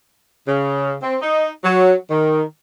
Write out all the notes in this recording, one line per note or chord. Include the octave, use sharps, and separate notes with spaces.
C#3
C4
D#4
F#3
D#3